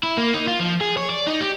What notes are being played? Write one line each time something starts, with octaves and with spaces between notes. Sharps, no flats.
E4
A#3
D#4
F4
F3
G#4
C#5
D5
D#4
G4